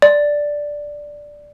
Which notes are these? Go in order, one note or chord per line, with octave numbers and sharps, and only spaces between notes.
D5